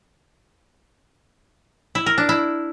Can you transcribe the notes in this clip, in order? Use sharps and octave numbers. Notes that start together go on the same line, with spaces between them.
E4
A#4
D4
E4